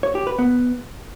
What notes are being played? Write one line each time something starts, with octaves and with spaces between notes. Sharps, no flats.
C#5
G4
B4
B3